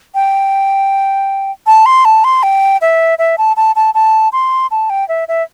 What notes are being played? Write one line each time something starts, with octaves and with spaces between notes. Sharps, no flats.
G5
A5
C6
A5
C6
G5
E5
E5
A5
A5
A5
A5
C6
A5
G5
E5
E5